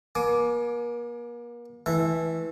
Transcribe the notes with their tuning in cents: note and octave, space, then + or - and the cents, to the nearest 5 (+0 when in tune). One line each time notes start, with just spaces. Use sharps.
A#3 +40 G#5 +30 D6 +0
E3 -15 A3 -35 E5 +0